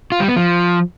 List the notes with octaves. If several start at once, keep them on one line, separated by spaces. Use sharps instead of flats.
F4
G3
B3
F3